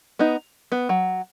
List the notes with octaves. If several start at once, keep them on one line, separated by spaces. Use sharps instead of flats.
B3 D#4
B3
F#3